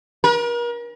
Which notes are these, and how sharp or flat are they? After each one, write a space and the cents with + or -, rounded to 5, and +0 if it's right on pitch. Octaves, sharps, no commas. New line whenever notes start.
A#4 +40